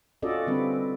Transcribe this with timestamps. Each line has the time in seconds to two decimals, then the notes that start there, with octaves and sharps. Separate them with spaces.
0.22 C#4 F4 F#4 A4 D5 D#5
0.47 D3 G3 C4 B4